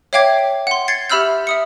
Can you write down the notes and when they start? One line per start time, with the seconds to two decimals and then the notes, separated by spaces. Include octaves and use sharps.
0.13 C#5 E5 F5 G5 D6 G#6
0.67 F#5 C6
0.88 G#6 A6 C7 C#7
1.10 G4 E5 B5 E6 F6 G6
1.47 E5 D#6 C#7